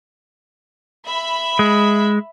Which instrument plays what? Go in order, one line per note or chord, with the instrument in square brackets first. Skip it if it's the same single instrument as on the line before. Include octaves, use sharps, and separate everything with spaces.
[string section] E5 B5
[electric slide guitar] G#3